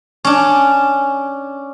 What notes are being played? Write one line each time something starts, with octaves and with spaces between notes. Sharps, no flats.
C#4 D4